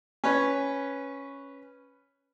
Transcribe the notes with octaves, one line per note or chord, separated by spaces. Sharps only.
C#4 B4 C#5